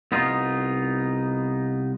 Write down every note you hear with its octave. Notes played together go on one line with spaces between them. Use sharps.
C2 B3 D#4 F4